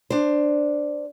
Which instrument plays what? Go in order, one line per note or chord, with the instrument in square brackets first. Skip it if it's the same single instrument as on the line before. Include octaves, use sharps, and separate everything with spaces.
[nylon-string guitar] D4 C5